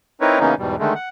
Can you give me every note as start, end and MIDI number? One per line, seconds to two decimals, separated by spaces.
0.21 0.39 60
0.21 0.39 63
0.21 0.39 64
0.21 0.39 70
0.21 0.39 71
0.21 0.39 73
0.40 0.55 49
0.40 0.55 52
0.40 0.55 58
0.40 0.55 59
0.40 0.55 61
0.40 0.55 63
0.58 0.76 40
0.58 0.76 44
0.58 0.76 47
0.58 0.76 55
0.79 0.94 50
0.79 0.94 51
0.79 0.94 56
0.79 0.94 57
0.95 1.09 78